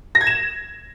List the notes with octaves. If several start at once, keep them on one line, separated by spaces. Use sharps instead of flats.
A#6
G#6
E7